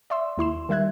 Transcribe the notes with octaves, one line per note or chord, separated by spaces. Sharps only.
D5 E5 C6 E6
D#2 E4 C6 E7
D#3 G3 E5 F#6 G#6